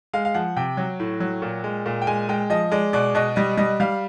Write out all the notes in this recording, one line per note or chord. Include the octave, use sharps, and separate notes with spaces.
G#3 F5
F5
F3 F#5
C3 G5
F#3
A2
F#3
A#2
G#3
A#2
G5
G#3 G#5
G#3 G5
F3 D#5
G#3 D5
B2 D5
B2 D#5
G3 D#5
G3 D#5
G3 F5